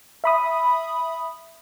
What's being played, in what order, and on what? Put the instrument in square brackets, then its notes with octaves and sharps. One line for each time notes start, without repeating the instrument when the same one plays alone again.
[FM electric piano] E5 B5 D#6